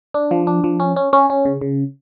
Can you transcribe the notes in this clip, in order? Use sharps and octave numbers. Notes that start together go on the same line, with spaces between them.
D4
F3
D4
F3
C#4
C#4
C#4
C#4
C#3
C#3